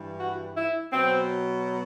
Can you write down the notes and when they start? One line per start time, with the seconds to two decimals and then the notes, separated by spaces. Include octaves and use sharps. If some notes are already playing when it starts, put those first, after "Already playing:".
Already playing: G2 E3
0.18 F#4
0.56 E4
0.92 B2 F#3 C4